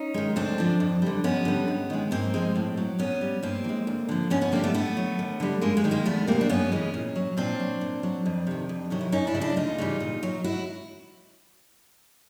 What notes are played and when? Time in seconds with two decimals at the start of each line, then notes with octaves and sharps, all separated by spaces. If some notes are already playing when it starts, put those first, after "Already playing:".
Already playing: C#4 D#4
0.14 D#3 G#3
0.36 D2 C4 D4
0.58 D3 F3
0.80 F2
1.02 D3 G3
1.24 F2 B3 C#4
1.45 D3 G3
1.68 G#2
1.90 D#3 G#3
2.11 G#2 A#3 C4
2.34 F3 G#3
2.56 A2
2.77 F#3
2.99 A#2 B3 C#4
3.21 G3
3.43 G2 A#3 C4
3.64 E3
3.69 G#3
3.87 D2
4.09 D3 F3
4.30 F2 B3 C#4
4.41 B3 C#4
4.52 D3 G3 A#3 C4
4.64 A3 B3
4.74 A2 A3 B3
4.97 F#3
5.19 D#2
5.40 D3 G3
5.61 F#2 G#3 A#3
5.77 G#3 A#3
5.84 D#3 G3
5.91 G#3 A#3
6.05 E2 A3 B3
6.27 B2 G3 A#3 C4
6.41 D4
6.49 F#2 B3 C#4
6.72 C#3 E3 G#3
6.94 A#2
7.16 F#3
7.37 A#2 C4 D4
7.60 F#3
7.81 A#2
8.03 F#3
8.26 F2
8.47 C3 D#3
8.69 F2
8.90 C3 D#3 F#3
9.01 E4
9.12 F#2 C#4 D#4
9.27 D4 E4
9.35 C#3 F#3
9.41 D4 E4
9.56 D2 D#4 F4
9.78 C#3 E3 G3
10.00 A#2
10.23 F#3
10.44 E4 F#4